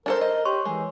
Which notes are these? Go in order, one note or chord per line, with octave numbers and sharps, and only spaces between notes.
D4 A4 A#4 C5
D#5
G4 C#5 C6 C#6
E3 G#3